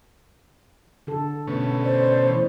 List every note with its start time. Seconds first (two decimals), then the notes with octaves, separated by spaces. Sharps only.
1.07 D3 A4
1.47 B2 A3 C#4
1.84 C5 D5
2.27 E3